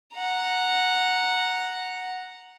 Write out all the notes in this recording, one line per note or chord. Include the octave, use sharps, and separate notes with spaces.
F#5 A#5